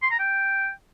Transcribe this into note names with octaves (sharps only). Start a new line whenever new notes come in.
C6
A#5
G5